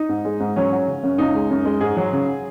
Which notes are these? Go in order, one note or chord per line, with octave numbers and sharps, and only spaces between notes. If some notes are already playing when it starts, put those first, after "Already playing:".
Already playing: D#4
G#2
G#3
G#2
F#3 C#4
F#3
C#3
F#2
C#2 D#4
G#3
F#2
G#3
G#2 G#4
F#3
C#3